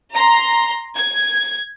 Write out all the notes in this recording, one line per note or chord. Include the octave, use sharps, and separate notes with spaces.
A#5 C6
G#6